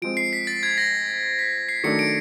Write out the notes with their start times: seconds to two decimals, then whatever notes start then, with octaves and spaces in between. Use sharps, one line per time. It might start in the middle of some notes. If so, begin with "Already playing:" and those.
0.02 F3 G#3 C4 D7
0.17 C7
0.33 B6
0.47 A6
0.63 G#6
0.78 A#6
1.39 B6
1.69 C7
1.84 D#3 F#3 A3 D4 C#7
1.99 D7